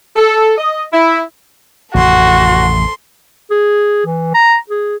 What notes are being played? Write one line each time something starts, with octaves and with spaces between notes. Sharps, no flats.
A4
D#5
E4
A1 F2 C3 F#4 A4 C6
G#4
E3
A#5
G#4